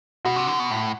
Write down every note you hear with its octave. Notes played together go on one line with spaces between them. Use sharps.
B2 F#4
C3
D3
B2
A2